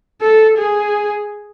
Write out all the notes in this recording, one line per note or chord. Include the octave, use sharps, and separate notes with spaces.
A4
G#4